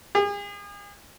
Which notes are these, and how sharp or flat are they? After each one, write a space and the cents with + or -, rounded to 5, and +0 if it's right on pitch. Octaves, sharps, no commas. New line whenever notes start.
G#4 -40